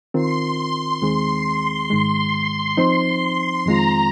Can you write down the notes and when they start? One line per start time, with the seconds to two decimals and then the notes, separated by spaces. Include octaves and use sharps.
0.14 D#3 C4 F4 A#4 C6
1.02 D#2 D#3 G#3 C4 G#4
1.90 G#2 D#3 G#3
2.77 F3 C4 D#4 C5
3.65 F2 D#3 G#3 C4 F4 A#5